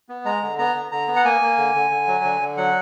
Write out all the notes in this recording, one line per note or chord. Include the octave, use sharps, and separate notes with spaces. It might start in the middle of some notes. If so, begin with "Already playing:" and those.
B3
G#3 A#5
D3
B3 A#5
D3
D3 A#5
B3
F#5
A#3 G#5
A#3
D3
D3
D3
F#3
D3
D3
F#3 F#5